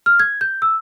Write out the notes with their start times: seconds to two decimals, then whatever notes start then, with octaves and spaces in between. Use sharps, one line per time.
0.06 F6
0.20 G#6
0.41 G6
0.62 E6